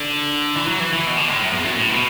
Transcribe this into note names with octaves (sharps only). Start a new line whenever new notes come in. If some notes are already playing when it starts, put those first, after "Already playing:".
Already playing: D3
E3
F#3
E3
E3
B2
D3
A2
F#2
E2
F#2
A2
B2